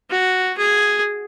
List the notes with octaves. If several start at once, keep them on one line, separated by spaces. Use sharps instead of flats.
F#4
G#4